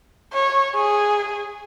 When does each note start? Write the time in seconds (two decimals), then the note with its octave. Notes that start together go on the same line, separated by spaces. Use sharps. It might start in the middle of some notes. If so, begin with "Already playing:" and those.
0.33 C#5
0.75 G#4